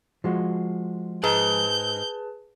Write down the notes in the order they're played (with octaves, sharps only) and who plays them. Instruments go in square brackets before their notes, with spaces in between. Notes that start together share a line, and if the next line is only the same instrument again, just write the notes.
[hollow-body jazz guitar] F3 G#3 F#4
[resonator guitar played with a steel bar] G#2 [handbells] G#4 B4 A5 [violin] G6